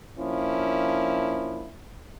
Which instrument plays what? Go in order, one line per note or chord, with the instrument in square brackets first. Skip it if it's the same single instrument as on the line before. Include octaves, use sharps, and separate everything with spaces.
[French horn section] F3 A#3 C#4 D4 E4